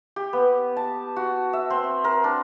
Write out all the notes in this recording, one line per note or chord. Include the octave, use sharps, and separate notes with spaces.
G4
B3
A5
F#4
E5
C4
A#4
D4